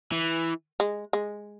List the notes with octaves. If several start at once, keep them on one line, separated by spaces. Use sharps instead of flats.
E3
G#3
G#3